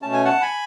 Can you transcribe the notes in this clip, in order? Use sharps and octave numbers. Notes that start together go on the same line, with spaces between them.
B2 A3 C#4 A5
G#5
F#5 A5
G#5 B5